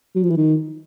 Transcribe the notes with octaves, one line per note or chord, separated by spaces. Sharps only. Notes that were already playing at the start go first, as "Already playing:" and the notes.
F#3
F3
E3
D#3